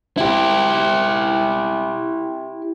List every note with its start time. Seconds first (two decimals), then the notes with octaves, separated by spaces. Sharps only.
0.18 E4 G4